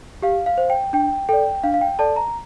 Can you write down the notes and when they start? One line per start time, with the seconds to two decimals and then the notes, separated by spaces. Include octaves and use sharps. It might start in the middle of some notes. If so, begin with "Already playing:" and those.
0.22 G4 F5
0.46 F5
0.58 C5
0.70 G5
0.93 D4 G5
1.29 A4 D5 G5
1.64 D4 F5
1.74 F5
1.81 G5
1.99 A4 D5 A5
2.16 A#5